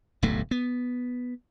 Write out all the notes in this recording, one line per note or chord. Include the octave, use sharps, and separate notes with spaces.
D1 B1 G2 A3
B3